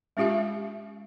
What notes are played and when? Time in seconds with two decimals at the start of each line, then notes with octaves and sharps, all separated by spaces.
0.17 G#3 C#4 F4 G4 E5 F5